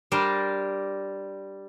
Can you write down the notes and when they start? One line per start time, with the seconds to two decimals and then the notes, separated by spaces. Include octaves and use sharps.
0.12 G3 D4 A#4 C5 D5